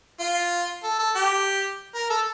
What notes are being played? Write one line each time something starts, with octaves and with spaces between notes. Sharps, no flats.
F4
A4
A4
G4
A#4
A4